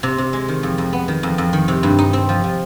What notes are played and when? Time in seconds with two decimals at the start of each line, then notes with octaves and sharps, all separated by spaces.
0.03 C3
0.18 C3
0.33 G#3
0.48 D#3
0.63 F2
0.78 F2
0.93 B3
1.08 D#3
1.23 F2
1.38 F2
1.53 D#3
1.68 C3
1.83 G2
1.98 D#4
2.13 C4
2.29 F3
2.44 F3